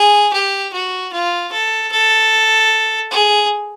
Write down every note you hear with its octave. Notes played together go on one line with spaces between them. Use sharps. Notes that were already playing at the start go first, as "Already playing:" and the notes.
Already playing: G#4
G4
F#4
F4
A4
A4
G#4